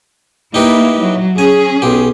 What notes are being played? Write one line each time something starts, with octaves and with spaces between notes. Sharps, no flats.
A#3 D#4 E4 G4 B4
F#3
C#4 G#4 G#5
B1 G4